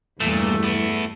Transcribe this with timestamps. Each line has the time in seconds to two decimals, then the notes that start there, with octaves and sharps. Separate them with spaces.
0.20 E2 G2 A#2 A3
0.63 B3 E4